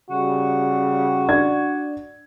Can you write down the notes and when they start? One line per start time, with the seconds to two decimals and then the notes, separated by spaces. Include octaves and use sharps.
0.10 C#3 G3 F#4
1.28 D4 D5 G#6